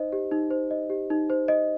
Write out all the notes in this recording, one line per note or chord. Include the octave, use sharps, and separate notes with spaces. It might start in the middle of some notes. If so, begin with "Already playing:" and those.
Already playing: D#4 C5 D#5
G4
D#4
C5
D#5
G4
D#4
C5
D#5